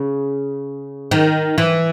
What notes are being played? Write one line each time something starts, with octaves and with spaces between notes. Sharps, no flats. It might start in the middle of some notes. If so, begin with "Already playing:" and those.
Already playing: C#3
D#3
E3